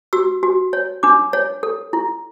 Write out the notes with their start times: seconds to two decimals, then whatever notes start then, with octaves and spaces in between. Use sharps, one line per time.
0.13 F#4 E6
0.43 F#4
0.73 C#5
1.03 D4 D6
1.33 C#5
1.63 A4
1.93 E4